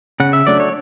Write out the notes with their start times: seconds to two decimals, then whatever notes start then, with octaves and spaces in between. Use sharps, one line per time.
0.20 C#3 F#5
0.33 E5
0.47 F#3 A3 D4 D5
0.60 C#5